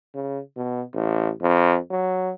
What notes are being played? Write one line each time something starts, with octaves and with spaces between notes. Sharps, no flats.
C#3
B2
A1
F2
F#3